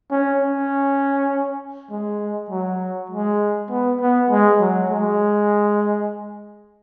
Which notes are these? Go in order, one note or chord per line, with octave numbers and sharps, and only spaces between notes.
C#4
C#4
G#3
F#3
G#3
B3
B3
G#3
F#3
G#3